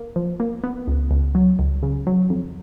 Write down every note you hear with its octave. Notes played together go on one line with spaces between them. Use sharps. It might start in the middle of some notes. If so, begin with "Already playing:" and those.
Already playing: A#3
F3
A#3
B3
C#2
C#2
F#3
C#2
C#3
F#3
F2